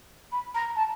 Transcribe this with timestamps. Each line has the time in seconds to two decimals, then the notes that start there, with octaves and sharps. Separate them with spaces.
0.32 B5
0.55 A#5
0.76 A5